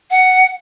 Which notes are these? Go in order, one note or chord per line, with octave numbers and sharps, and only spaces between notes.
F#5